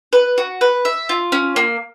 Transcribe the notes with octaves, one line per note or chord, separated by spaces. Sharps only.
B4
F#4
B4
E5
F4
C#4
A#3